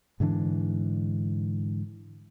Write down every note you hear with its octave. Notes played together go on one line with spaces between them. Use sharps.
G#2 D3 E3 D4